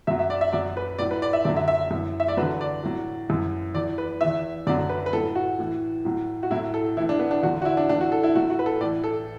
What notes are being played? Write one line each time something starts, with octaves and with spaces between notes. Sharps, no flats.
F#2 F#3 E5
E5
D5
E5
F#2 F#3 D5
B4
A2 F#3 D5
B4
D5
E5
F#2 D3 F#3 D5
E5
E5
F#2 E3
E5
D5
E2 D3 F#3 B4
D5
A2 F#3
F#2 E3
E2 E3 D5
B4
E2 E3 E5
F#2 D3 F#3 D5
B4
B4
A2 F#3 A4
F#4
A2 E3
A2 F#3
F#4
A2 F#3 E4
A4
A2 E3 E4
D4
B3
D4
E2 D3 F#3 F#4
F#4
E4
D4
A2 E3 D4
F#4
A4
E4
A2 F#3 F#4
F#4
B4
A4
A2 E3 D5
A4